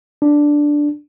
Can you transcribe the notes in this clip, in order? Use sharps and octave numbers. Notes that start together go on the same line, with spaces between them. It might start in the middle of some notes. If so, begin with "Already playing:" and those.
D4